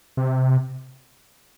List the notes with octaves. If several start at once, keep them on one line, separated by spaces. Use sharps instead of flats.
C3